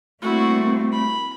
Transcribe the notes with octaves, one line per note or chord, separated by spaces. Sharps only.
G3 A3 A#3 C4 E4 F#4
B5